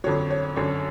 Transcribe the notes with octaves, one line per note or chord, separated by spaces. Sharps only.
F2 D3 F#3 C#5
C#5
F#2 D3 F#3 C#5